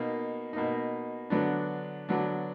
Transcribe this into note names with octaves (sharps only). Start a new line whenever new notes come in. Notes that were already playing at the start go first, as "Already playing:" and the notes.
Already playing: B2 A#3 D#4
B2 A#3 D#4
D3 F#3 B3 D4
D3 F#3 B3 D4